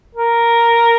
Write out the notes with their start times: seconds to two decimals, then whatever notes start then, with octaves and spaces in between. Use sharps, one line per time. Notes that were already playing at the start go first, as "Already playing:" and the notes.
0.15 A#4